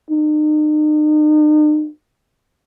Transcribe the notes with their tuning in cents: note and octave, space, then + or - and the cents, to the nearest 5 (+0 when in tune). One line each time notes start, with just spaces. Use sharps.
D#4 -40